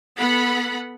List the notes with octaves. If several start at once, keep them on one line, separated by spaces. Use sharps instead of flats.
B3 A4 F#5 B5